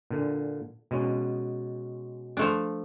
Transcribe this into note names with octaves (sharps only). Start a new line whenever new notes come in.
A#2 D3
B2 G#3 C#4
F3 A3 D4